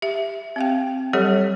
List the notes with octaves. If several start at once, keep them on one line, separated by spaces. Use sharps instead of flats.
G4 E5
C4 F5 G5
F#3 G3 G4 A4 C#5 F#5